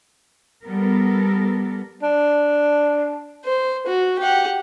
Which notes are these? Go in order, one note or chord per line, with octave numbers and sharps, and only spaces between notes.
G3 B3 A4 A#4
D4
C5
F#4
G4 F#5